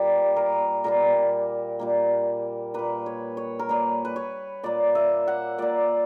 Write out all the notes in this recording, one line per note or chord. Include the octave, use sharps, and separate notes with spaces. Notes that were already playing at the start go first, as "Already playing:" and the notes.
Already playing: A#2 G3 A#3 G4
A#4
A#2 G3 A#3 A#4
A#2 G3 A#3
A#2 A#3 B4
C#5
C#5
A#4
A#2 A#3 B4
B4
C#5
A#2 A#3 D5
E5
F#5
A#2 A#3 D5